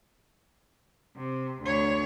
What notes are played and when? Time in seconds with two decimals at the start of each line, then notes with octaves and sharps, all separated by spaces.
1.17 C3
1.62 D2 C#5